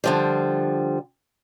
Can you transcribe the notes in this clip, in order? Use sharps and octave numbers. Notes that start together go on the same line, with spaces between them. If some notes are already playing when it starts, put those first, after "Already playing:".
D3 F3 G3